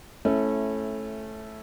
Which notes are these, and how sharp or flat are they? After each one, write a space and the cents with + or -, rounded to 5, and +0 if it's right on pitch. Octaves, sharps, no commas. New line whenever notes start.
A3 -10 C#4 -25 E4 +0